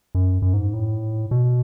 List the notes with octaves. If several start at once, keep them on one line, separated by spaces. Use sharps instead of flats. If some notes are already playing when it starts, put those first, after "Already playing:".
F#2
F#2
G#2
A2
B2